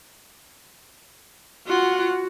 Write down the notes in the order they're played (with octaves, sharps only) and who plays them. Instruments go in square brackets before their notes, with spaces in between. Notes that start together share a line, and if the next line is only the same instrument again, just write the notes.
[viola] F4 F#5 [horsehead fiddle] F#4